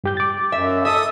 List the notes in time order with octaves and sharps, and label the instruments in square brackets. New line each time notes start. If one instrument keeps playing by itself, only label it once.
[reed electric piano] G2 G4 G6
D6 A6
[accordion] F#2 [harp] E5
[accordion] A4 [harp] E5 [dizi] D#6